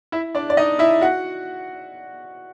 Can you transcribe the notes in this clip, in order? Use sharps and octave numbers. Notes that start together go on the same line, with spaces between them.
E4 E5
D4 D5
D5
D#4 D#5
E4 E5
F#4 F#5